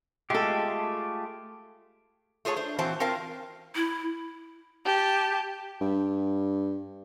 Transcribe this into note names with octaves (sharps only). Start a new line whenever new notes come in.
G#3 A3 F4 G4 A4
A3 F4 G#4 C#5 A5
D4 C5
A#2 E3 C4 F#4 C5 A5
C4 F4 A#4 C5 F5 A5
E4
G4 A5
G2